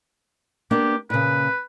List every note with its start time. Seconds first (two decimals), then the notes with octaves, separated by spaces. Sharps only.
0.71 A#3 B3 D4 G4
1.10 A#2 C#3 B4